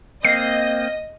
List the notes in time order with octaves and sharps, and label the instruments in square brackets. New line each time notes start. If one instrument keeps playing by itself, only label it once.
[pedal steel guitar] A#3 C4 [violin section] D#5 [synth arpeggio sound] C7